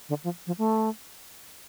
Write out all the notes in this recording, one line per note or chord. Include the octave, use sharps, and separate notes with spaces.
D3
F3
F3
A3